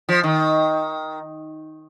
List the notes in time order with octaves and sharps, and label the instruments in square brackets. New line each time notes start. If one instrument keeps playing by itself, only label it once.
[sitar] F3
D#3